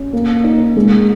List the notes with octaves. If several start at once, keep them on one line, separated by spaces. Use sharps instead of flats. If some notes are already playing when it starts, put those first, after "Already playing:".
Already playing: C#4
A#3
D#4
G#3